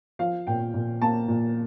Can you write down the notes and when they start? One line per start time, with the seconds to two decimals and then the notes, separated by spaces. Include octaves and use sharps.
0.19 F3 F5
0.47 A#2 G5
0.74 A#2
1.02 A#3 A5
1.28 A#2